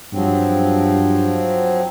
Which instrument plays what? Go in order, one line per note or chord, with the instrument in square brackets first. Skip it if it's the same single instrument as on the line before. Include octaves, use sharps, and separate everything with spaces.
[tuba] G2 [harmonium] F3 F#3 C4